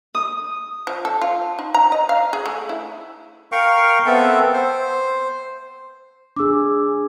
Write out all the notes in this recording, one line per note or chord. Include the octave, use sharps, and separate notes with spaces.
D#6
F3
A4
F4
D#4
A#5
D#5
F5
G#4
A3
E4
A#4 F5 G5 C#6
B3 C4 A4 E5
C5
D4 G#4 D6 E6